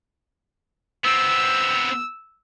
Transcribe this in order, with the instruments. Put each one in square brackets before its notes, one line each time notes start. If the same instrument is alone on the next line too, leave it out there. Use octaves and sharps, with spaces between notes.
[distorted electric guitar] B3 C4 [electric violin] E6